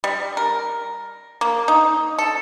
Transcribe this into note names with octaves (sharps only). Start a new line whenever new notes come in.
G3
A#4
A#3
D#4
A4